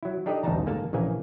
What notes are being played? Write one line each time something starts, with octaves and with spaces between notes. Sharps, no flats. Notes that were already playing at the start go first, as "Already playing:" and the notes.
F#3 E4
D4 D#4 G4 A4 D5 D#5
A1 D2 G2 D#4 A5 A#5
G1 G#2 A#3 A4 A5
A#1 C#3 E3 A#3 G#5